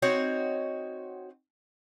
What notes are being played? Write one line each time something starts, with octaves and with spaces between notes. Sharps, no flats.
C4 D#4 F#4 C#5